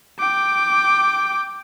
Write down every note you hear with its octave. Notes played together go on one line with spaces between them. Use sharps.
G5 D6